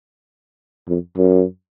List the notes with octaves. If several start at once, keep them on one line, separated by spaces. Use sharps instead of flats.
F2
F#2